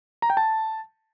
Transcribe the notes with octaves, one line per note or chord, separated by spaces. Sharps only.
A#5
G5
A5